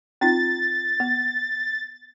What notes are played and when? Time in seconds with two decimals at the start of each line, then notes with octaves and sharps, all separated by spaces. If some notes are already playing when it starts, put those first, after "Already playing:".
0.21 C4 D#4 F4 A6
1.00 B3